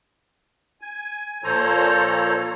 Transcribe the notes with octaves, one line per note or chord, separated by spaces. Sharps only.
G#5
A#2 F3 A4 C5 C#5 A#5